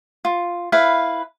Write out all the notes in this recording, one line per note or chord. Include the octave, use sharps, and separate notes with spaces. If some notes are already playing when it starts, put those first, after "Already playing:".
F4
E4 B4 F5